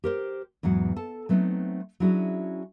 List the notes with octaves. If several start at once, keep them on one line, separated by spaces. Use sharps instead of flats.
G4 A#4 C5
E2 G#2 F#3 F#5
A4 A5
F#3 A3 B3 C4 D#4
F#3 C#4 D4 E4 F#4 G#4